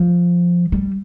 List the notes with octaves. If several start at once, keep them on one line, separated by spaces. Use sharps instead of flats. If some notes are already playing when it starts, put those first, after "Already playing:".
Already playing: F3
G3